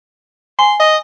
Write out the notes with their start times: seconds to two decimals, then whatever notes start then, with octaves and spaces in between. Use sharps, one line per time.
0.59 G#5 C6
0.79 D#5